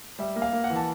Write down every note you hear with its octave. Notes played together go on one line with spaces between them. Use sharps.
G3 E5
A#3
F5
A#3
F#5
E3
A5